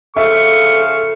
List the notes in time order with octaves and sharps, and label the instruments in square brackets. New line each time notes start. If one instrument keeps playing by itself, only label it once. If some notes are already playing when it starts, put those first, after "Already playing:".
[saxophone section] C#3 F3 F5 [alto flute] A4 [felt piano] E5 [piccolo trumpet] C#6